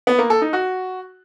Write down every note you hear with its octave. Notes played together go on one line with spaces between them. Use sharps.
B3
A#3
A4
D#4
F#4